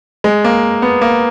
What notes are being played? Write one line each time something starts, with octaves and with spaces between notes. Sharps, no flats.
G#3
A#3
B3
A#3